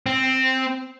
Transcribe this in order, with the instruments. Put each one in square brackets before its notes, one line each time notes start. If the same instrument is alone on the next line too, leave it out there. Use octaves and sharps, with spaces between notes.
[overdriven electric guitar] C4